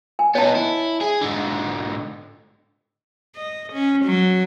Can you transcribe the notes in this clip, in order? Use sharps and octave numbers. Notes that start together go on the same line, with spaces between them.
G#5
B3 D#4 C#5 A5
E4
G#4
G#2 D3
D#5
C#4
F#3